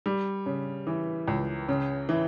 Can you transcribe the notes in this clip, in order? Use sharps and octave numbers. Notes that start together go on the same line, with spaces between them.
G3
C#3
E3
C#2
C#3
E3